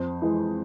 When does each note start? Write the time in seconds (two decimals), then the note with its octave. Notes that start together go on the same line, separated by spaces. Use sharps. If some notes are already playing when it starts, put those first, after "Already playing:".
Already playing: F2 C5
0.22 E3 G#3